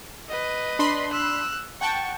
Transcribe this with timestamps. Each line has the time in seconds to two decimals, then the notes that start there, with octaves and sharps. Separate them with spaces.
0.29 B4 D#5
0.79 D4 B5 C6
1.12 E6 F#6
1.81 F#5 G5 A5 C#6